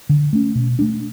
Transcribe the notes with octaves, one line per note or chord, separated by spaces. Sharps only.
D3
A3 C#4
B2
A3 D4